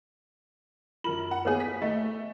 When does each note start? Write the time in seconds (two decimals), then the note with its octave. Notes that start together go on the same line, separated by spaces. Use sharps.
1.04 F#2 F4 A#4 F#7
1.31 F#5
1.45 A#3 B3 G#4 B4 C#5
1.60 B6
1.82 A3 D#5